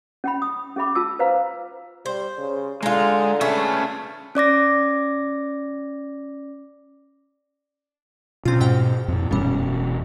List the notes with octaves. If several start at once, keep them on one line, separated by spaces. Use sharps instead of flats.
C#4 G5 B5
D#6
C#4 G#4 E5 B5 D6
F4 A5 E6
B4 C5 F5 A#5
G3 C5
C#3
D3 G#3 D#4 F4
A3 C#4 G#4 B4
C#4 D5 D6 A#6
B2 C4 C#4 F4
G#2 G5 F6
F2 A#2
E1 F#2 G3 C#4